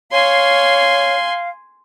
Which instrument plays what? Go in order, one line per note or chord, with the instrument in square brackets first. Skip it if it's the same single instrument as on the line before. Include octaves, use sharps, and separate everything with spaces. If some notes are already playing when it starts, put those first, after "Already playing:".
[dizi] C#5 [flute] F5 [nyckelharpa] G#5 C6